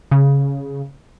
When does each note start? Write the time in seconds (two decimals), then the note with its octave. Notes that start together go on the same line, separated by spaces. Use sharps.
0.11 C#3